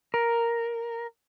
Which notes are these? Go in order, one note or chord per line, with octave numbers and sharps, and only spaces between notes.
A#4